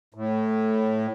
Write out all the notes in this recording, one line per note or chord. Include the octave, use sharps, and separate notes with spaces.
A2